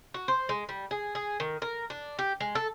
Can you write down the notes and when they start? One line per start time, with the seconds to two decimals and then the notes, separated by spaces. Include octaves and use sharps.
0.14 F#4
0.28 C5
0.49 G#3
0.69 G3
0.91 G#4
1.15 G#4
1.40 D#3
1.62 A#4
1.90 D4
2.19 G4
2.40 G#3
2.55 A4